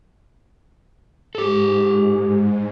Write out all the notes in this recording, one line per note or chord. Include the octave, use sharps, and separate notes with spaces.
G#2 G4 A4